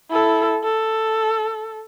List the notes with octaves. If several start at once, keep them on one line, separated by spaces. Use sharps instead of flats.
E4 A4
A4